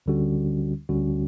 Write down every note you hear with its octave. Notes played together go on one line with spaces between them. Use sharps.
D2 D3 G3 C#4 F#4
D2 D3 G3 C#4 F#4